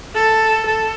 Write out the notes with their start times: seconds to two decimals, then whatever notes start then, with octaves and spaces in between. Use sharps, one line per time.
0.15 A4
0.66 A4